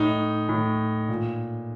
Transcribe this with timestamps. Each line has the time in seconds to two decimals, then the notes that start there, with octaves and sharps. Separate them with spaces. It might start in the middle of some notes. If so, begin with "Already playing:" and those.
Already playing: A2 D#4
0.49 A2
1.09 A#2